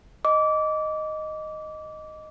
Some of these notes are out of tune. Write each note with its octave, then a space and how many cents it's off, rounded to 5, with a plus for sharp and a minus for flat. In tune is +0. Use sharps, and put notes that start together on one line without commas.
D#5 +0 D6 -25